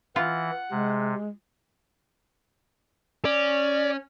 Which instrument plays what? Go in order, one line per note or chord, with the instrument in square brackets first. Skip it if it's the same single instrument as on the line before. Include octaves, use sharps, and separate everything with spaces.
[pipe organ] E3 [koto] F4 [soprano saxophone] F#5
[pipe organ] C3 [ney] G#3
[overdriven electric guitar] C#4 [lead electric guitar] D5